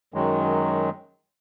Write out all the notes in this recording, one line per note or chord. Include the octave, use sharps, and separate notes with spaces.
F#2 D#3 F#3 G#3